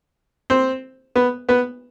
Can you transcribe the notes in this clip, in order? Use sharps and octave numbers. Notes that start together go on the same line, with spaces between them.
C4 C5
B3 B4
B3 B4